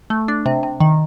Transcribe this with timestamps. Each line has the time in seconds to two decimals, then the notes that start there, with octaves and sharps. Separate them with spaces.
0.10 A3
0.28 D4
0.46 C3
0.63 C3
0.80 D#3